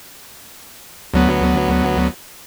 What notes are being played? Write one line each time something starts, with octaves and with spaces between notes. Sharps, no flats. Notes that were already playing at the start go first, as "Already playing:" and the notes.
D2 F#3 B3